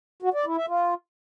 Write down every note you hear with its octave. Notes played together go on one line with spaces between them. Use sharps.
F#4
D5
E4
E5
F4